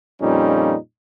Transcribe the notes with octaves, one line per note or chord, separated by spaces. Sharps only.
F2 A#2 G3 C#4 D#4